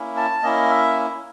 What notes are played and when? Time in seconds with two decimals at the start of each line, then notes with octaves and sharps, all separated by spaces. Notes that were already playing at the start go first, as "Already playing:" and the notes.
Already playing: A#3 C#4 E4
0.17 A5
0.43 A#3 C#4 E4 D#5
0.70 E5